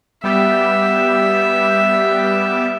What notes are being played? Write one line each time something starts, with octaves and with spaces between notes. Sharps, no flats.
G3 B3 G4 E5